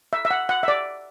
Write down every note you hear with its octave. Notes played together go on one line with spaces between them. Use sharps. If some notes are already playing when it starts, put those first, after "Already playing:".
E5
E5
F#5
F#5
E5
D5